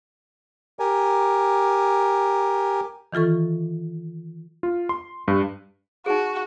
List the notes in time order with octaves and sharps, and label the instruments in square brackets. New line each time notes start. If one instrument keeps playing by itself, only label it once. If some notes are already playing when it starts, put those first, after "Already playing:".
[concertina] G4 A#4 G#5
[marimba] D#3 E3 F4 A4 C#6
[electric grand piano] F4
C6
G2
[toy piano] D#4 G#4 [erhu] F#4